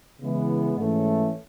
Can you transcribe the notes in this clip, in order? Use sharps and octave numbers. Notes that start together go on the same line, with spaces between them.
C#3 E3 G#3 B3 E4
G#2 E3 A3 C#4